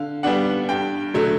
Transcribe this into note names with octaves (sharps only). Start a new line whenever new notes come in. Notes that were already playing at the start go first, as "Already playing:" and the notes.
Already playing: D3 F5
G3 B3 D4 F#5
G2 G5
D3 F#3 A3